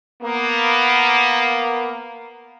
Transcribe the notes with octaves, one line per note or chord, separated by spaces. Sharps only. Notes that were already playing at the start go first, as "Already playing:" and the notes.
A#3 B3